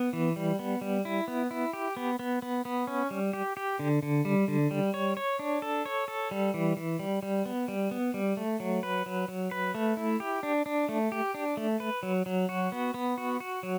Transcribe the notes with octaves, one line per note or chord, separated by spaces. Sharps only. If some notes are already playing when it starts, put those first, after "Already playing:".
Already playing: B3
E3
G3
B3
G3
E4
B3
E4
G4
B3
B3
B3
B3
C#4
G3
G4
G4
D3
D3
G3
D3
G3
C#5
C#5
D4
A4
C#5
A4
G3
E3
E3
G3
G3
B3
G3
B3
G3
A3
F#3
B4
F#3
F#3
B4
A3
E4
G4
D4
D4
A3
G4
D4
A3
B4
F#3
F#3
F#4
B3
B3
F#4
F#4
F#3